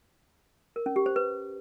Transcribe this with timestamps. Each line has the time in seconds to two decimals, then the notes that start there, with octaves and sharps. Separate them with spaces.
0.76 A#4
0.86 C#4
0.96 G4
1.06 C5
1.16 B4